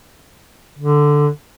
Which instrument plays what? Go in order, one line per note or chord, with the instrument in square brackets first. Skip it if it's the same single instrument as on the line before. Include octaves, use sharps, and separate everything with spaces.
[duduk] D3